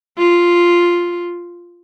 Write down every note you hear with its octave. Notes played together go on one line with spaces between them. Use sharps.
F4